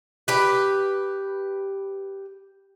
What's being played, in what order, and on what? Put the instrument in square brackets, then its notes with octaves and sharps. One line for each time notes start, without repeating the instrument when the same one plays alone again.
[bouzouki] G4 B4